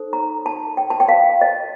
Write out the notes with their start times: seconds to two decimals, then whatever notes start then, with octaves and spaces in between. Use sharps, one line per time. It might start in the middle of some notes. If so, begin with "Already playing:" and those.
Already playing: D#4 A4 C5
0.13 A#5
0.46 A5
0.77 G5
0.90 A5
1.00 G5
1.09 F5
1.41 D#5